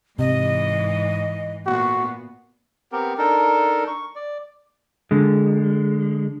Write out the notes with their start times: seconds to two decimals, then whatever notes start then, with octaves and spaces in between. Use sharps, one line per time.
0.19 G#2 C3 E3 D#5
1.66 A#2 B3 F#4
2.92 B3 C4 G4 A#4
3.18 D4 D#4 A4 A#4
3.88 C#6
4.16 D5
5.11 D3 G#3